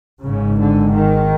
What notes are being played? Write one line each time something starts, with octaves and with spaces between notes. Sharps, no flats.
G#1 G#2 C#3
D3
D#3